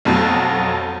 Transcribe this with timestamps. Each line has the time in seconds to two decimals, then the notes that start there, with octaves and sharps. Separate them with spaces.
0.05 B1 F2 B2 F#3